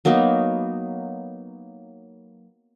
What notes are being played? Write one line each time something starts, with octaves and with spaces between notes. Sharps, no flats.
F#3 A#3 B3 D#4